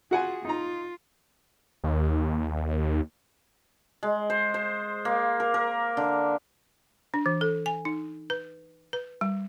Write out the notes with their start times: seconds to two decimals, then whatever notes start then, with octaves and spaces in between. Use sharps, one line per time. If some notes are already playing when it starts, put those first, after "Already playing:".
0.11 F4 F#4 G#4 F#5 G#5
0.45 D#4 F4 A#5
1.84 D#2
4.03 G#3
4.30 C5
4.54 C5
5.05 A#3
5.40 A#4
5.54 A#4
5.97 D3
7.14 D4
7.26 E3
7.41 A4
7.66 G#5
7.85 D#4
8.30 B4
8.93 B4
9.21 G3